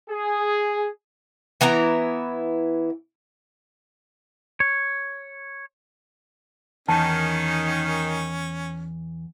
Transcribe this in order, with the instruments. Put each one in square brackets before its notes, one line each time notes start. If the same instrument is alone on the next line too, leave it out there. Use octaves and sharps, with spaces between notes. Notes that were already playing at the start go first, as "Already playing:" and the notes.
[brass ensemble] G#4
[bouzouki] E3 B3 E4 A#5
[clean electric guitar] C#5
[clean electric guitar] E2 [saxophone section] D#3 [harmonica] C#4 [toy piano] A5